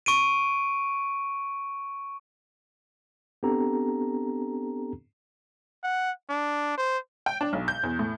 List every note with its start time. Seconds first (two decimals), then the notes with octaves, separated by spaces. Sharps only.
0.06 C#6 D7 D#7
3.43 B3 C4 D4 G4 A4 A#5
5.83 F#5
6.29 D4
6.78 C5
7.26 G5
7.41 D4
7.53 B1
7.68 G6
7.83 E2
7.99 A2